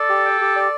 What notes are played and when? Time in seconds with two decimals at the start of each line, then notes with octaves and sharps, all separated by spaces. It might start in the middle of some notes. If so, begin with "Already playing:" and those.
Already playing: A4 D5
0.09 G4
0.26 G5
0.41 G4
0.56 D5